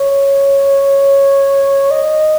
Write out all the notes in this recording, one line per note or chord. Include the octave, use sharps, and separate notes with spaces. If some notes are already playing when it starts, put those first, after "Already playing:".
Already playing: C#5
D#5